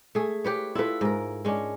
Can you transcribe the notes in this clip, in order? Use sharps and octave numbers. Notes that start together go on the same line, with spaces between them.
A3 G#4
G4 B4 C#5
E4 F4 A4 B4
G#2 A#4
G#3 C#4 D4